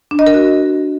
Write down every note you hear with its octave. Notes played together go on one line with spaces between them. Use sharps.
D4
D#5
A#4
F#4